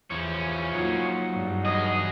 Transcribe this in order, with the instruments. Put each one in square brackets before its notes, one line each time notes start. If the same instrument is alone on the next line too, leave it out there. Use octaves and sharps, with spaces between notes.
[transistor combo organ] E2 [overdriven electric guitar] F3 C#4
[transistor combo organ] F#3 D#4 [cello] A#3 F4
[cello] G2 G#3
[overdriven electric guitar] E2 G#4 [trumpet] D#5